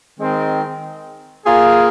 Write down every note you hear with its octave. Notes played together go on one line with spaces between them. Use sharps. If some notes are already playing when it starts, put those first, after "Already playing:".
D#3 G#3 C4
A#3 F4 G#4